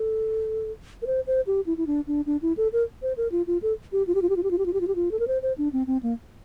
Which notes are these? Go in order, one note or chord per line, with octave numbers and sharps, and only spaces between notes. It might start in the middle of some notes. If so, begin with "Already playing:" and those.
Already playing: A4
A#4
C5
C5
G4
E4
E4
D4
D4
D4
E4
A4
A#4
C5
A#4
F4
F4
A4
G4
F4
G4
F4
G4
F4
G4
F4
G4
F4
G4
F4
G4
F4
A4
A#4
C5
C5
D4
C4
C4
A#3